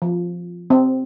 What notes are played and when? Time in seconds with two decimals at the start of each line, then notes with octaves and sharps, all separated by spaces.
0.02 F3
0.70 C4